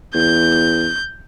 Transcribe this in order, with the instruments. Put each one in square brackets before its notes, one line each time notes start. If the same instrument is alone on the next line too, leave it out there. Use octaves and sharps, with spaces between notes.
[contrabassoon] E2 [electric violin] G6